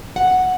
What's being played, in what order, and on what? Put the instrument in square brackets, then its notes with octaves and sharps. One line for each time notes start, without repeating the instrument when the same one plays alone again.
[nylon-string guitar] F#5